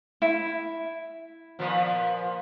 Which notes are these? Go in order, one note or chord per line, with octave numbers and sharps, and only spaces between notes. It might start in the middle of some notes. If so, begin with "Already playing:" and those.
E4
A#2 F3 B3